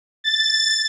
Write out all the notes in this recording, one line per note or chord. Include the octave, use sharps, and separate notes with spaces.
A6